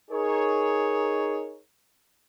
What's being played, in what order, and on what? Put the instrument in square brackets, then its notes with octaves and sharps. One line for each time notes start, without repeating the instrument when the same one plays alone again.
[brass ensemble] D#4 G#4 A#4 C#5